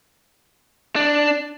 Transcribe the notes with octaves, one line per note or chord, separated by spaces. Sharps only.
D4